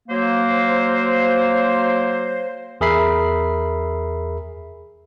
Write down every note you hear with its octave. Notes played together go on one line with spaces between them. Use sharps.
F#3 A#3 C5
E2 G#4 A#4 E5 B5 C7